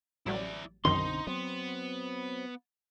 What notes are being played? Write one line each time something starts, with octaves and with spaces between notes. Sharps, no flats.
A1 F#3 G3 E4 D5
B1 F#2 D3 D#3 C4 D#4 C6
F#3 B3 C4